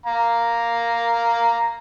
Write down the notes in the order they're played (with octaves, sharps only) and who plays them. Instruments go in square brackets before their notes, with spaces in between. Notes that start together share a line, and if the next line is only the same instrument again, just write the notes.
[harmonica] F5 A#5